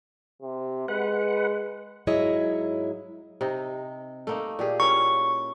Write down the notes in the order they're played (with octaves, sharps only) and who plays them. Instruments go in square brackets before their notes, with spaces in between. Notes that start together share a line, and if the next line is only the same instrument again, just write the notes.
[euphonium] C3
[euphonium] G#3 [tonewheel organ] B4 F#5
[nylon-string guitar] G#2 F#3 E4 G#4 C#5 D#5
[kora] C3 D#4
A3 A#3 D#4
A#2 G4 G#4
[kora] C#4 E4 A#4 [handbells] C#6